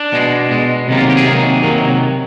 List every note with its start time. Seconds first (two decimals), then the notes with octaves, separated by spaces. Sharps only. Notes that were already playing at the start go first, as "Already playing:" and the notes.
Already playing: D4
0.13 B2 G#3
0.51 B2 G#3
0.88 C3 D#3 F#3 A#3
0.97 F4
1.10 G4
1.17 G#4
1.26 C3 D#3 F#3 A#3
1.63 C3 D#3 F#3 A#3